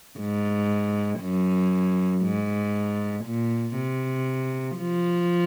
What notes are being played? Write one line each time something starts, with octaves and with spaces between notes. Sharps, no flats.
G#2
F#2
G#2
A#2
C3
F3